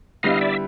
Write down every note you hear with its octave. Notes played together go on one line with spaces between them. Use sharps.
D3 G3 B3 E4 D#5 F5
D5 E5